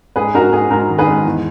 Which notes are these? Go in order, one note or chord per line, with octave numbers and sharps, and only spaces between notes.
G#2 G#4 B4
G#2 F#4 A#4
G#2 G#4
G#2 F#4 A#4
D#3
G#4 B4
G#2
E2